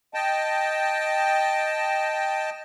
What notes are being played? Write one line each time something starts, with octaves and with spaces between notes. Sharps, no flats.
D#5 G5 A5